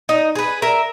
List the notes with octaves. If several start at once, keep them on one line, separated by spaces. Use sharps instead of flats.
D#4
G#4 B4
A#4 E5